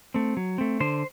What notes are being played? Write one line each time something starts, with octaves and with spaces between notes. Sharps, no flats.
A3 C4
F#3
A3 C4
D3 C5